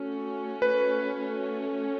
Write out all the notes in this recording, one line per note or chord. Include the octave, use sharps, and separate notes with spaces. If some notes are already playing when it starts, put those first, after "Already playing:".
Already playing: A3 C#4 F#4
B4